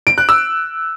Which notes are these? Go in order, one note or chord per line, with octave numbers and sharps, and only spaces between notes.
D7
F#6
E6